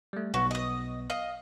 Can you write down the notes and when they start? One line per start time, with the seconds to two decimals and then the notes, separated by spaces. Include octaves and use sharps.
0.13 G3 A3
0.34 B1 B3 F#4
0.51 D#5 D#6
1.10 D#5 F5